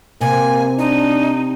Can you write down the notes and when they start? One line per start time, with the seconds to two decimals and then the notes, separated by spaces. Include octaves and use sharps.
0.21 C3 A#3 G#5
0.79 D4 D#4